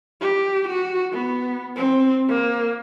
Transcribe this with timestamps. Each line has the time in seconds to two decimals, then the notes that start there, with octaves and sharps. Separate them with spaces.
0.21 G4
0.69 F#4
1.13 B3
1.76 C4
2.29 A#3